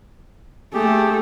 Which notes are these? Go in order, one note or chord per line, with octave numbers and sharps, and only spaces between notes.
A3 G4 G#4